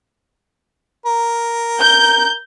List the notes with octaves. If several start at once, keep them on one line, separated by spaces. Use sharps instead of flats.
A#4
G6